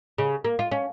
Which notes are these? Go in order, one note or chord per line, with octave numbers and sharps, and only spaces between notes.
C#3
A#3
F4
C#4